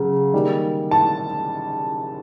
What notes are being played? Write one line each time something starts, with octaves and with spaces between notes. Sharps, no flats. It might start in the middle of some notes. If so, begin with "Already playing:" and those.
Already playing: C#3 F#3
D#3 G3 A#3
A5